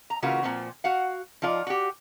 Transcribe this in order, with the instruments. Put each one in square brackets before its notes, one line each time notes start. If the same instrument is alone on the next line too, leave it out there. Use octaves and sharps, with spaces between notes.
[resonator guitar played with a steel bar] A#5
C#3 E3 A#3 F4 F#4
A#2 F3 C4
F#4 F5 F#5
F3 D#4 F4 D5
F#4 G4